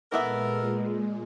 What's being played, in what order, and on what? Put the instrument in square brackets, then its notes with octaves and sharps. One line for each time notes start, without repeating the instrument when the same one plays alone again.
[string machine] A#2 G#3 [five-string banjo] E3 B3 E5 [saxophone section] A4 A#4